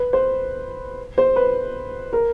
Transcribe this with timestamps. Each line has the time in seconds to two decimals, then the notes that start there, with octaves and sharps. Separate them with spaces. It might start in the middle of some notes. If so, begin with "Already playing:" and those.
Already playing: B4
0.13 C5
1.18 C5
1.36 B4
2.13 A#4